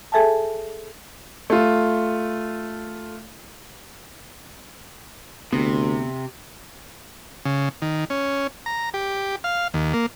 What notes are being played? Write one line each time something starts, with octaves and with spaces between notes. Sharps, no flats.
G#4 A4 E5 G#5 A5
A3 F4
D2 C3 B3
C#3
D#3
C#4
A#5
G4
F5
D#2
A#3